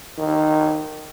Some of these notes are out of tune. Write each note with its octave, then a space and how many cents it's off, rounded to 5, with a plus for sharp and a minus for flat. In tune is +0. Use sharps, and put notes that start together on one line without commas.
D#3 -15